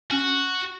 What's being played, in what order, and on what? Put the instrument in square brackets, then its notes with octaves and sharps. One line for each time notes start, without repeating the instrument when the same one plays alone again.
[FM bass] C#4 [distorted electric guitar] F#4